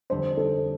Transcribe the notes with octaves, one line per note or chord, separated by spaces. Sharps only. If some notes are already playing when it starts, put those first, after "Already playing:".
F2 D3 G3 D4 C5
A4